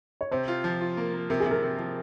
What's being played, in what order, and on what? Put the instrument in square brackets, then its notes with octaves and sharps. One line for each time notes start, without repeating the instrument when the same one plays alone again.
[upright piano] C#5
[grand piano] C3 [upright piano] C5
[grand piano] F4
F3
F4
A#3
A#3
[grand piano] C3 [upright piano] A#4
[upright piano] G#4
[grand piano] C3
[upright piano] A#4
[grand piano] C3
F3